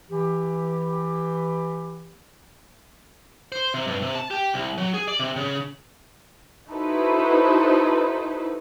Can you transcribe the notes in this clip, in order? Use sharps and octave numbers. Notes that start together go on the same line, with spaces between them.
E3 G4
C5
C3
G2
C3
A5
G4
C2
F#3
G#4
D5
C3
C#3
D#4 E4 F#4 A4 B4 C5